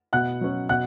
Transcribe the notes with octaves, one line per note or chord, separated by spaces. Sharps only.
B2 F#5 F#6
F#3 C#4
B2 F#5 F#6